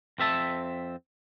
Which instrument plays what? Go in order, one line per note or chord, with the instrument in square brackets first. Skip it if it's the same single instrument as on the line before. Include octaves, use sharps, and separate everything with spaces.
[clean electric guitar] F2 C4 E5 A5